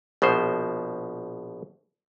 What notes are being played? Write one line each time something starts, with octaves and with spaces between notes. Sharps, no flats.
A#1 B2 F3 C5